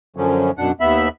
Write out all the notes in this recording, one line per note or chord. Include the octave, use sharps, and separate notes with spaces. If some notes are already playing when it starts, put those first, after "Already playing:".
F#2 D3 F3 F#3 C#4
F#2 B2 D4 F#5
D#2 B3 E5 B5